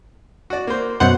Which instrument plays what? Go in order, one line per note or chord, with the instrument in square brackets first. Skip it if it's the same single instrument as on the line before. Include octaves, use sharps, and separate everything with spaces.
[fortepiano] F#4 D5
A#3 C5
[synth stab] F#2 B2 F#5 [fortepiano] C5